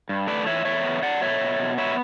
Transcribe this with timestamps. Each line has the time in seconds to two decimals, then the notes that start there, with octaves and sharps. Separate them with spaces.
0.09 G2
0.27 A3 B4 D5
0.46 E3 C#5 E5
0.65 E2 C#5 E5
0.84 B3
1.02 F#3 D5 F#5
1.22 B2 C#5 E5
1.41 B2
1.59 B2
1.78 B3 C#5 E5